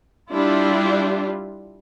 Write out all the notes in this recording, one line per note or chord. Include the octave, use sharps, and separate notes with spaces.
G3 D4 E4 F4